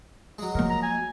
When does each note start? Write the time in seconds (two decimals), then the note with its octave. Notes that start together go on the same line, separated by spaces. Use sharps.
0.39 F#3 G#3
0.55 F3 A#3 A#4
0.70 A#5
0.82 G#5